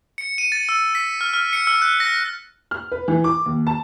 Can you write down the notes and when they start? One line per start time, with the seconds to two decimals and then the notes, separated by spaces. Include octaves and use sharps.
0.18 C#7
0.38 D#7
0.52 A6
0.69 E6
0.95 B6
1.21 F6
1.34 F6
1.53 C#7
1.67 E6
1.82 F#6
2.00 A#6
2.71 F6
2.92 B4
3.08 E3
3.24 D6
3.46 D#2
3.67 A5